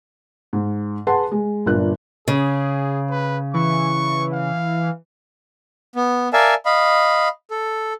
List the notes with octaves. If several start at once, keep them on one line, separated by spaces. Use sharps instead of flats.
G#2
G#4 B4 F#5 A5 C6
G#3
G1 A#2 D4 A#4 F#6
C#3 G#4
B4
E3 C#6
F5
B3
A#4 D5 E5 F5 G#5 A5
D#5 F5 B5
A4